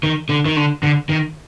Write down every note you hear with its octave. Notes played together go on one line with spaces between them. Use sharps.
D#3
D3
D#3
D3
D3
D#3